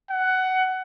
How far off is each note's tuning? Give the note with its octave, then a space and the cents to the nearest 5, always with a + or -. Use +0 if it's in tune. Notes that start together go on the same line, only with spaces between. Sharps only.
F#5 +15